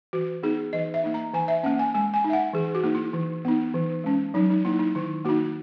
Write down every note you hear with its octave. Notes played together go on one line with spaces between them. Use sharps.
E3 F#4
B3 D#4 G#4
E3 D#5
E5
A#3 D#4
A#5
E3 G#5
E5
A#3 C#4 F#5
G#5
G#3 G#5
G#5
D#4
E5
F#5
E3 G#4
F#4
A#3 D#4
E4
E3
B3 D#4
E3
G#3 C#4
F#3 D#4
D#4
A#3 D#4 E4
D#4
D#3 E4
A#3 D#4 F#4